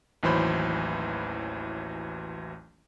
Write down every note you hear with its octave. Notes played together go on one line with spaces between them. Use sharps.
A1 D#2 E3 F#3 C5 B5